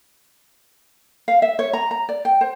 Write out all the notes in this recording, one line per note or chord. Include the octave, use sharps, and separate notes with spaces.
F5
E5
C#5
A#5
A#5
D5
G5
C5